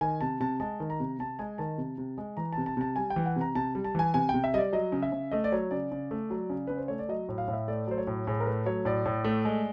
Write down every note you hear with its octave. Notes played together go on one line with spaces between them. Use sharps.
D#3 G#5
C3 A5
C3 A5
G#3 A5
D#3
A#5
C3
C3 A5
G#3 G#5
D#3 A5
C3
C3
G#3
E3 A#5
A5
C3
A5
C3 A5
G3 G#5
G5
E3
F#5
C3 A#5
C3 A5
G3
A5
E3 G#5
C3 G#5
G5
C3
E5
G3 D5 D#5
F#3 D#5
C#3
E5
C#3
A3 D#5
D5
F#3 C#5
C#3 D5
C#3
A3
F#3
C#3
C#3 B4
C5
A3 C#5
D5
F#3 D#5
A2
F5
A2
E5
A3 D5
F#3 C5
C#5
A2
A2 G#4
A#4
A3 B4
F#3 C#5
A2 D5
A2
A3
G#3